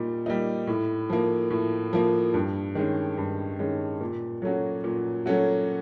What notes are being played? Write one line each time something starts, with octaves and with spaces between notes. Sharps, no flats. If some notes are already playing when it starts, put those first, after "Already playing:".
Already playing: A#2 G3 A#3 D#4
G3 A#3 D#4
A2
F3 A#3
A2
F3 A#3
G2
D#3 G#3 C#4
G2
D#3 G#3 C#4
A#2
F#3 A3 C#4 F#4
A#2
F#3 A3 C#4 F#4